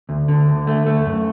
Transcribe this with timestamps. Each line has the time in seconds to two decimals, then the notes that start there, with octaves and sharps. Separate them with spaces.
0.09 D2
0.28 D3
0.48 D2
0.67 A3
0.86 A3
1.06 F#2